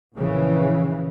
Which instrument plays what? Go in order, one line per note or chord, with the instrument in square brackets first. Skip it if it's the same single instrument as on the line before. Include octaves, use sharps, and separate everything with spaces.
[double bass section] A#1 C#3 E3